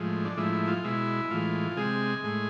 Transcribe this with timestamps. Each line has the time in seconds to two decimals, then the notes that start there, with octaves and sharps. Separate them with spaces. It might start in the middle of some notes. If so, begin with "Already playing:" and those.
Already playing: A2 F3 G#3
0.25 D4
0.37 A2 F3 G#3 E4
0.53 E4
0.68 F4
0.84 B2 G#3 E4
1.30 A2 E3 G#3 F4
1.77 C3 G#3 G#4
2.24 A2 G#3